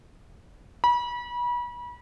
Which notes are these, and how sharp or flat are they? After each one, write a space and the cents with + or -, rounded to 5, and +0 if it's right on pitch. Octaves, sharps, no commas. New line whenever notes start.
B5 -35